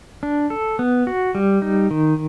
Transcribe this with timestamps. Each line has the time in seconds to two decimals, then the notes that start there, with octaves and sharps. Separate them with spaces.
0.23 D4
0.50 A4
0.79 B3
1.07 F#4
1.35 G3
1.62 D#4
1.91 D#3